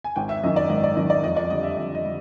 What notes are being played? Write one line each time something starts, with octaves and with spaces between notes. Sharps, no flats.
G#5
G#1 G5
E5
F#2 D#3 D#5
D5
G#1 D#5
D5
F#2 D#3 D#5
D5
F2 D#5
D5
D3 G3 D#5
E5
F2 D#5
D#5
D3 G3